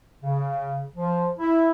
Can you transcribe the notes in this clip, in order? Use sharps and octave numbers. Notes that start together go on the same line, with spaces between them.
C#3
F3
E4